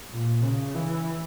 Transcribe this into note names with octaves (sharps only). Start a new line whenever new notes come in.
A#2
C#3
E3